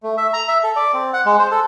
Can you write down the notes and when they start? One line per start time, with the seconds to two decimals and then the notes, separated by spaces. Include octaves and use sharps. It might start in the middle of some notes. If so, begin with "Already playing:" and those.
0.03 A3
0.18 E5
0.33 A#5
0.48 E5
0.64 A4
0.76 D5
0.94 C4
1.13 F#5
1.26 G#3
1.39 C5
1.51 A4